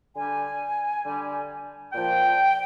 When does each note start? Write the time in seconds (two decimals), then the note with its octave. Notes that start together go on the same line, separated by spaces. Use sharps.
0.15 D3 G3 G#5
1.04 D3 G3
1.93 A#2 F3 G5